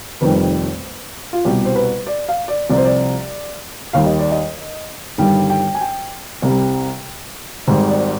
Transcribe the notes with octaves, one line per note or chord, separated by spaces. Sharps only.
F1 F2 D#3 G3 B4
F4
C2 B2 G3 G4
C5
B4
D5
F5
D5
C2 C3 F3 D5
C5
D5
D#2 D#3 G3 F5
D#5
D5
D#5
G1 G2 D#3 G3 G5
G5
G#5
G5
C2 C3 G3
G#1 G#2 G3
D5